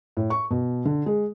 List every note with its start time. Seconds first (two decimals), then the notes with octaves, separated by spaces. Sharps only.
0.17 A2
0.30 C#6
0.51 B2
0.85 D3
1.06 G#3